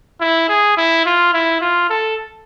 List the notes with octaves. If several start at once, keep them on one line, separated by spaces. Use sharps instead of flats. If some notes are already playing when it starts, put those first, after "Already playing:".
E4
G#4
E4
F4
E4
F4
A4